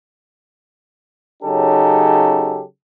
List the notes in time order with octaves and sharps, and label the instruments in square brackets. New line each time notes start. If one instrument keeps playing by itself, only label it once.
[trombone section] C#3 F#3 C#4 D#4 G4 A4